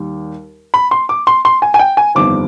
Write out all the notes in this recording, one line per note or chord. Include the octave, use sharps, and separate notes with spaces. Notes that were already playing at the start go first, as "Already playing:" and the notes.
Already playing: D#2 G3
B5
C6
D6
C6
C6
G#5
G#5
G5
G#5
G1 F2 D#3 G3 D6